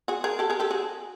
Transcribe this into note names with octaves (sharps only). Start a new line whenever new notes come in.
F#4 G#4
G#4 A#4
G4 A4
G#4 A#4
G4 A4
F#4 G#4